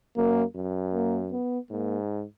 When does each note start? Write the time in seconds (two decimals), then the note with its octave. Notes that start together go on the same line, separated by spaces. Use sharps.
0.16 F#2 A#3
0.55 F#2
0.94 A#3
1.32 B3
1.70 G#2 A#3